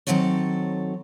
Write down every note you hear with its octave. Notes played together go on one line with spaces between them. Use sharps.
D#3 E3 F#3 C4 A4 C#5